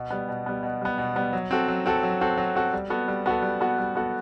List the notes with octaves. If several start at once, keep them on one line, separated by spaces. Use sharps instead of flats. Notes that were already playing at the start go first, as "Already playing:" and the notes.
Already playing: B2
G3 B3
B2
G3 B3
B2
G3 B3
B2
G3 B3
F#3
C4 F#4 A4
F#3
C4 F#4 A4
F#3
C4 F#4 A4
F#3
C4 F#4 A4
G3
B3 F#4 A4
G3
B3 F#4 A4
G3
B3 F#4 A4
G3
B3 F#4 A4